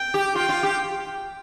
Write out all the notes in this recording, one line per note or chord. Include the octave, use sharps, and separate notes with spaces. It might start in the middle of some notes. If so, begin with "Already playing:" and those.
Already playing: G5
G4
F4 G5
F4
G4